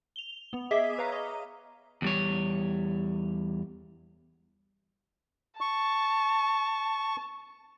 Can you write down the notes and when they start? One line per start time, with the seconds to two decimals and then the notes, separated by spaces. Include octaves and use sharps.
0.16 F7 G7
0.53 B3
0.71 G#4 D#5 E5 D6 B6
0.98 B4 C#5 F5 A#5
1.12 D#5
2.02 E2 G3 C#5
5.61 A5 C#6